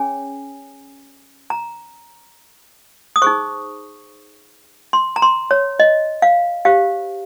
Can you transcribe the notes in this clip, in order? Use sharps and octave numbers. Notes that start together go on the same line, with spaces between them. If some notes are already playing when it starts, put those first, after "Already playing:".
Already playing: C#4 G#4 C#5 G#5
A#5
D#6
D#4 G#4 C5 C#6
C6
A#5
C6
C#5
D#5
F5
G4 C5 F5